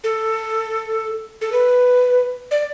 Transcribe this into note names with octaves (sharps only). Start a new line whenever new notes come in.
A4
A4
B4
D5